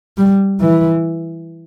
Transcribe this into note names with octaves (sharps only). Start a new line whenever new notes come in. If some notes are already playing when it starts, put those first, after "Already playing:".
G3
E3